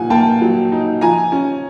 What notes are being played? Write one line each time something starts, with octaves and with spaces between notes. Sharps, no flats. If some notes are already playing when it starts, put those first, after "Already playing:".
Already playing: A#2 D#4 F#5 G#5
A#3 G5 A5
F#3
D#4
F3 G#5 A#5
C#4